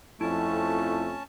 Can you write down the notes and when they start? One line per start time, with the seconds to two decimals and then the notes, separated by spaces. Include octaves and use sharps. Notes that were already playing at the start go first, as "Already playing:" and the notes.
0.21 F2 A3 C#4 E4 D#5 A5